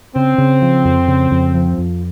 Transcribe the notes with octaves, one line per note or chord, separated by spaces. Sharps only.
C#3 C4
C#3
F3
F2
C#3
F2
F3
F2